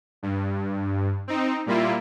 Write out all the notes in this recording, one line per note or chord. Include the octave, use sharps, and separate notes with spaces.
G2
C4 D#4
A#2 G3 A#3 E4 F4